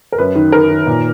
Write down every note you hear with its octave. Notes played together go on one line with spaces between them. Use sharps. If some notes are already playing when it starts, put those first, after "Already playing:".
A#4
F#2 B4
D#3
D#3 A#4
D#3
A#2